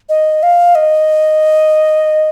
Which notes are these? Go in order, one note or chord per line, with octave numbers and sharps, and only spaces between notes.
D#5
F5
D#5